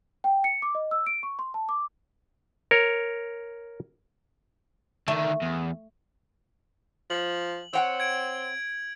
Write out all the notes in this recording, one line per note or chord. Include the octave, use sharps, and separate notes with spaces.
G5
C#7
D6
D#5
E6
D7
C#6
C6
A5
D6
A#4 C#5
D3 D#3 A3
E2
F3 F#7
C4 C#5 F#5 G5
G#6 D7